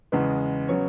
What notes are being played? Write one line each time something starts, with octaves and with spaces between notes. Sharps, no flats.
E2 C#3 G#3 B3
C#3 F#3 B3 C#5